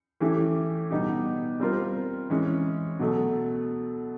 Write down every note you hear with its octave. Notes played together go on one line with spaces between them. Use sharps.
E3 A3 C#4 E4 G4
B2 G3 B3 D#4 G4
G3 C4 F4 A#4
E3 G#3 C#4
B2 F#3 A3